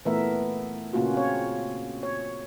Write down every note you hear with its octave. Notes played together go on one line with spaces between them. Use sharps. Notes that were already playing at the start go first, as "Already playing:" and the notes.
A#2 E3 A3 B3 A#4 E5
A#2 C#3 A#3 C#4 F4 F#4
C4 C#5
C#5